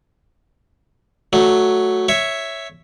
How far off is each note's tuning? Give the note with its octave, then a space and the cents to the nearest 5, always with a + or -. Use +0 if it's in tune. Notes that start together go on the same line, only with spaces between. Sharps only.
F#3 +0 A3 +0
C#5 +0 E5 +0